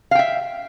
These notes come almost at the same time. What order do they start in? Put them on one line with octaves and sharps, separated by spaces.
F5 G5 E5